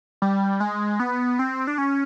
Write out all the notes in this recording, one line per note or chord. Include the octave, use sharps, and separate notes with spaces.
G3
G#3
B3
C4
D4
C#4